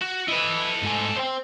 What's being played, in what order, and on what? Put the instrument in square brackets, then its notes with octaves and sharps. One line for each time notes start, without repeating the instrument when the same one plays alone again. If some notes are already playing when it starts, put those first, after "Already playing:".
[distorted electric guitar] F#4
[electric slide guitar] E4 B4 [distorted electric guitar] A4 D#5
[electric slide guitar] G#2 A3 G#5
C5 G5